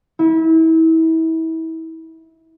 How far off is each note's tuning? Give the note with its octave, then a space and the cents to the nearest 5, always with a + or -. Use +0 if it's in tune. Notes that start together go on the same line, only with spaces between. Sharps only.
E4 -30